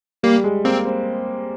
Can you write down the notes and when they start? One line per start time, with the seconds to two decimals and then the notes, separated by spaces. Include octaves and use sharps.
0.23 G3 A#3
0.44 G#3
0.65 A#3 C4
0.85 C4